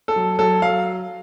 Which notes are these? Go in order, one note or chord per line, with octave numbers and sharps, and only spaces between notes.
A4
F#3
F#3 A4
F#3 F5